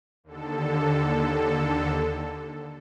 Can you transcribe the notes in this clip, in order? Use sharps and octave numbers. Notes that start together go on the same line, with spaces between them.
D#2 D3 A4